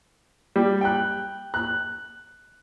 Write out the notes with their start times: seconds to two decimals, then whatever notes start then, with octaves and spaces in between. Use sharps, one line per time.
0.56 G3
0.81 G5 F#6
1.54 F#6